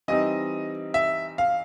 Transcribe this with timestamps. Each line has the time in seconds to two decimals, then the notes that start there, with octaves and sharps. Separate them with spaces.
0.08 E3 G3 C4 D#4 D#5
0.94 E5
1.38 F5